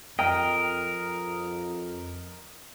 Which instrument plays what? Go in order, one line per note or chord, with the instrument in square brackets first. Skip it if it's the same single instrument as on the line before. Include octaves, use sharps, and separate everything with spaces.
[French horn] F2 [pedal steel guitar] A#4 D#5 [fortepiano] G5